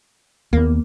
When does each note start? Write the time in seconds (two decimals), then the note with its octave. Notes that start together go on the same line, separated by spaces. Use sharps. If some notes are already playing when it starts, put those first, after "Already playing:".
0.53 D#2 A#3 B3